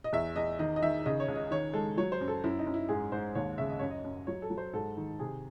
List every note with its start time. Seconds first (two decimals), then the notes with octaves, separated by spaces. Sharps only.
0.04 D#5
0.13 E2 E5
0.36 E2 D#5
0.59 D#3 D#5
0.76 D#5
0.82 D#3 E5
1.05 C#3 D#5
1.20 C#5
1.28 C#2
1.35 D#5
1.51 D#3 C#5
1.74 G#3 A4
1.97 F#3 C#5
2.12 C5
2.21 F#2
2.28 A4
2.44 F#2 E4
2.59 D#4
2.67 F#2
2.74 E4
2.89 G#2 G#4
3.12 G#2 C5
3.35 D#2 C#5
3.58 C#3 E5
3.69 D#5
3.79 F#2 C#5
3.90 D#5
4.04 F#2
4.27 F#3 C#5
4.42 A4
4.50 F#3
4.58 C5
4.73 G#2 A4
4.97 D#3
5.19 C3 G#4